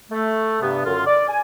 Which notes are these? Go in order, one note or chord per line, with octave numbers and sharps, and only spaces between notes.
A3
G2 C3 B3
F#2 D3 F4
D5
G#5